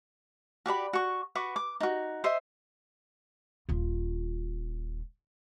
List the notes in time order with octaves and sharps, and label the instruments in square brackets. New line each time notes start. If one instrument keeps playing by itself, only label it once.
[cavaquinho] F#4 G4 D5 B5
F#4 C#6
F#4 B4 C#6 D6
D6
D#4 F#4
C5 D#5 E5 C6
[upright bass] D#1 F4